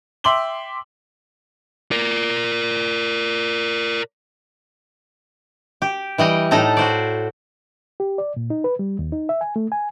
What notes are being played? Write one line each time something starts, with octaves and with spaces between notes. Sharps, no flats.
E5 G5 C6 D6 F#7 G7
A#4 D5
G4
E3 G3 D#5 G5
A2 D#4 A4 D#5 A#5
F#4 C5 D5
G4
D5
A#2
D#4
B4
G3
D#2
D#4
E5
G#5
A3
G#5